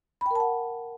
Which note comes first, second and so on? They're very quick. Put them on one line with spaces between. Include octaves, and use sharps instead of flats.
B5 G5 A#4 A5 F#5